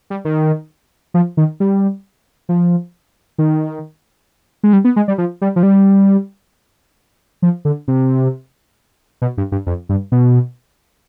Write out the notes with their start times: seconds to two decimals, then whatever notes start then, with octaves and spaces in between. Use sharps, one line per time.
0.10 G3
0.25 D#3
1.14 F3
1.37 D#3
1.60 G3
2.49 F3
3.38 D#3
4.63 G#3
4.73 G3
4.85 B3
4.96 G#3
5.08 G3
5.18 F3
5.42 G3
5.56 F3
5.63 G3
7.42 F3
7.65 D3
7.88 C3
9.22 B2
9.38 G2
9.52 G2
9.67 F2
9.89 G2
10.12 B2